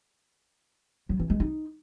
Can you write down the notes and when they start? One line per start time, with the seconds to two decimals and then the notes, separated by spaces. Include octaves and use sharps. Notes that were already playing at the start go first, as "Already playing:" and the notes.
1.09 F#3
1.20 E3
1.30 G#3
1.40 D#4